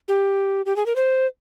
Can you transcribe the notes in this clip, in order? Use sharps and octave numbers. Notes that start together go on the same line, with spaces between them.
G4
G4
G#4
A#4
C5